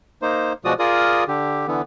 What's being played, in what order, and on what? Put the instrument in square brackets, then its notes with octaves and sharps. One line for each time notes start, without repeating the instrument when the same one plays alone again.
[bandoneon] A#3 D#4 C5
B2 F3 G#3 F#4 D5 D#6
F4 G#4 A#4 D5 D#6
D3 G4
D3 E3 B3